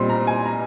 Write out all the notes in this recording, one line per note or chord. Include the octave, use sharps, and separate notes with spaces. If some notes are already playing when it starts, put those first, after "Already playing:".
Already playing: A#2 G3 C4 C6
A#5
G#5
A#5